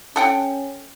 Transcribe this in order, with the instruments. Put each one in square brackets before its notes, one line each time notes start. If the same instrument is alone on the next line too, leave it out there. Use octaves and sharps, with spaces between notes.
[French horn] C#4 [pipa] A4 F#5 G5